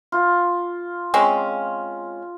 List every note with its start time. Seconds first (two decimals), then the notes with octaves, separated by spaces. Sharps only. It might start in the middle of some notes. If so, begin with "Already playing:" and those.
0.12 F4
1.14 G#3 C4 C#4